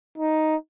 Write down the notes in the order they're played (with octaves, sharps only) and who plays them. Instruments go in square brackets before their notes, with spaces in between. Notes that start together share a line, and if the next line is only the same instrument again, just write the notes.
[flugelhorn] D#4